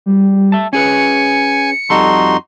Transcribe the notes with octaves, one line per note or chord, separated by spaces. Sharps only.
G3
E5 A5
C#4 G#4 B4 G#5 C#7
F2 G3 D#4 F#4 A4 C6